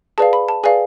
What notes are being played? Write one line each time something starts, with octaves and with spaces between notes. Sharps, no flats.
G#4 B4 D5 F5 A5
B5
A5
G#4 B4 D5 F5 G#5